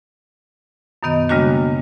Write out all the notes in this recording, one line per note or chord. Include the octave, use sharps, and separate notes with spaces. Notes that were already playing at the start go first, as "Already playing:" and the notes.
F#2 B2 D#3 B3 D#5
C#3 G3 G#3 A#3 D4 F#4